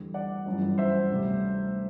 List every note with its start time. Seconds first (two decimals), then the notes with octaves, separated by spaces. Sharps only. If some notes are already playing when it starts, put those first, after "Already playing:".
Already playing: E2 D3 G3
0.14 D5 F#5
0.46 G1 F#2 E3 G3
0.78 C5 E5
1.10 D2 C3 G3